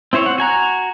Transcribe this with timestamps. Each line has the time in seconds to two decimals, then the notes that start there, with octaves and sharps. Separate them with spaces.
0.13 C4 E4 C5 C#5
0.26 F#5
0.38 F#4 G#5 A#5